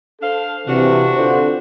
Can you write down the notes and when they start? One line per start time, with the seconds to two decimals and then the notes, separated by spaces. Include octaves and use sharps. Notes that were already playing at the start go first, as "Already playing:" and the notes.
0.21 D4 A4 C5 F5
0.67 C3 E3 D4 F#4
1.16 D3 F4 C5